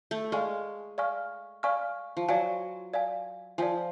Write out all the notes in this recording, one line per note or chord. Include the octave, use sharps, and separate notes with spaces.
A3
G#3 D5 F5 G#5 C#6 F6
D5 F5 G#5 C#6 F6
D5 F5 G#5 C#6 F6
F3
F#3 D5 F5 G#5
D5 F5 G#5
F3 D5 F5 G#5